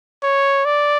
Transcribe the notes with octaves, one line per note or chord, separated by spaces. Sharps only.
C#5
D5